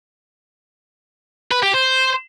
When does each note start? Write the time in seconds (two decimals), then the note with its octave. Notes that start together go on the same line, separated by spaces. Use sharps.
1.51 B4
1.63 G4
1.74 C5